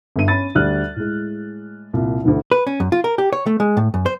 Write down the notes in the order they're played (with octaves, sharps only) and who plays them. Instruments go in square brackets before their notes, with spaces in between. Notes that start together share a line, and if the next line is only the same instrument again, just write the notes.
[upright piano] G1 G2 D#7
C#4 B5 A6
D2 G3 D5 F6 F#6
A2 G#3
C2 A#2
D2 D3 E3
[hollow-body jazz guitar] B4
C#4
F#2
F4
A#4
G4
C#5
A3
G#3
A2
F#2
C5